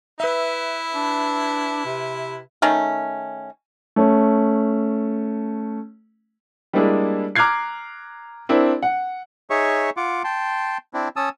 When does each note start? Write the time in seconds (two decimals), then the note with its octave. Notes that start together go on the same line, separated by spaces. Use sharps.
0.20 E4 B4 E5
0.94 D4
1.85 C3
2.62 D#3 A3 C#4
3.96 A3 C#4
6.73 G3 G#3 A#3 D4 E4 G#4
7.35 A#5 D6 F6 F#6 G#6 C7
8.49 C4 D4 E4 A#4
8.83 F#5
9.50 D#4 G#4 C#5 E5 C#6
9.97 F4 F#5 D6
10.24 G5 A5 C6
10.94 C4 D4 E4
11.16 C#4 A5 D#6 E6